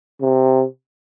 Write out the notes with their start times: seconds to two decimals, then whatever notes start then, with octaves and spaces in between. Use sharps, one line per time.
0.21 C3